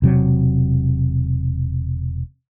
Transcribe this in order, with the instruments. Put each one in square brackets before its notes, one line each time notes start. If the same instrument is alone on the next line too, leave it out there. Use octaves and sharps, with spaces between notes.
[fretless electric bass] E1 C3 F#3